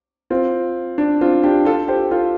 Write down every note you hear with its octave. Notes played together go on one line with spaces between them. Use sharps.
C4 F4
D4
C4 F4
D4 G4
F4 A4
G4 C5
F4 A4